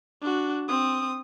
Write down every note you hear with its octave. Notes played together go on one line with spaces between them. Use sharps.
D4 F#4
C4 D#6